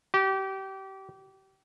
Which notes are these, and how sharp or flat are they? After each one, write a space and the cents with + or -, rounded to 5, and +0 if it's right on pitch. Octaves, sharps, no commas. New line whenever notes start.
G4 -30